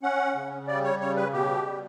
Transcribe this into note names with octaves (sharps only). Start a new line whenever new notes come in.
C#4 F#5
C#3
G3 D5
C#5
C#3 C#5
B4
B2 G4
G3